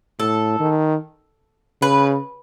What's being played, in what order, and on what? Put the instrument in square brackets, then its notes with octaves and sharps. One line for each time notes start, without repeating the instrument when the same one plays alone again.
[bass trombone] A2 [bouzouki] A4
[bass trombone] D#3
[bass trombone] C#3 [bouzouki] B4